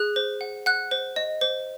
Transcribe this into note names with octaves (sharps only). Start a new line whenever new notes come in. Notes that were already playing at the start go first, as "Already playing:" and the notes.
Already playing: G#4 F#6
C5
F#5
F#5 F#6
C5
D#5
C5